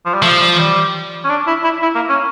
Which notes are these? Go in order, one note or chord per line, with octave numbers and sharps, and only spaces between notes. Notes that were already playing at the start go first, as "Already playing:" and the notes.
F3
G3
F3 A3
G3
G3
C#4
D4
E4
E4
E4
A#3
C#4